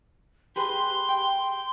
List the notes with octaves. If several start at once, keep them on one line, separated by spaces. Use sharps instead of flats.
G4 G#4 B4 C6
G5